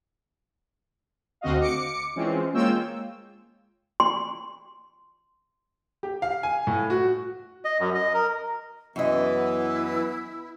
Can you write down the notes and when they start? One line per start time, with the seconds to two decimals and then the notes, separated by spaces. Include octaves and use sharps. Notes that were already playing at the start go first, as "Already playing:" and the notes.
1.41 D2 D3 C4 F#4 D#5 F5
1.60 D6 C#7
2.16 E3 G#3 C4 C#4 F4
2.54 G#3 A#3 F4 C#5 G5 E6
4.00 C6
6.03 G4
6.22 F5
6.43 G#5
6.67 A2
6.90 F#4
7.65 D#5
7.80 F#2
7.95 D#5
8.14 A#4
8.96 F#2 E3 B3 E4 D#5